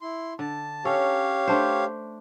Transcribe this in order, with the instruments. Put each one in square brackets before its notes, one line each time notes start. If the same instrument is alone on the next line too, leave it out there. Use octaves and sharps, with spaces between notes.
[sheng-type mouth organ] E4 C6
[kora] D3 [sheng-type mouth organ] A5
[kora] C#4 A4 [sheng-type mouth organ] G4 C#5 F5
[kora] A3 D4 C5